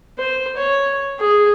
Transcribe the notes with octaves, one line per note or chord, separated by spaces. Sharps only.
C5
C#5
G#4